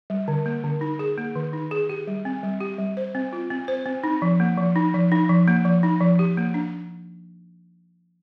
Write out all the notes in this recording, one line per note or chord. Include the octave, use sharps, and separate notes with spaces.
G3
D3
A#3
D3
D#4
G#4
A#3
D#3
D#4
G#4
G4
G3
C4
G3
G4
G3
C5
C4
F4
C4
C5
C4
D#4
F3
A#3
F3
D#4
F3
D#4
F3
A#3
F3
D#4
F3
G4
A#3
D4